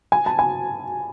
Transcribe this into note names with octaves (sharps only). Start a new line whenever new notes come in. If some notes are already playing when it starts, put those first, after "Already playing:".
G#5
A5
G#5